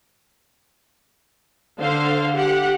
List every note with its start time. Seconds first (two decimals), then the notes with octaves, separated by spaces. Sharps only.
1.80 D3 C5 F5
2.36 G4 F#5